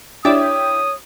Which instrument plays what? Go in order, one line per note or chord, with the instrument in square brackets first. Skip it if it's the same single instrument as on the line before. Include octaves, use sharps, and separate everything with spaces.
[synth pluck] D4 D5 E5 [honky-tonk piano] E4 G4 [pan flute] C#5 [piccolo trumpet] D#6